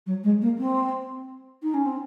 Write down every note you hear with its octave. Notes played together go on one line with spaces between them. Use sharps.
F#3
G#3
A#3
C4
D#4
C#4
C4